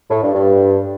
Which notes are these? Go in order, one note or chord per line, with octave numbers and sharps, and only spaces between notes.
A2
G2
G2